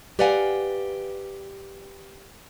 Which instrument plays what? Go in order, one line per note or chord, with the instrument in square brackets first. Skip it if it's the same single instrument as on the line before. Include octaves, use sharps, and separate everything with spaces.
[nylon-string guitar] G4 B4 D5 F5 F#5 G#5